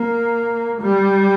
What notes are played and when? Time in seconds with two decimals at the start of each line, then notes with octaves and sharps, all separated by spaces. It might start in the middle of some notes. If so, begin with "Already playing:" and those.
Already playing: A#3
0.82 G3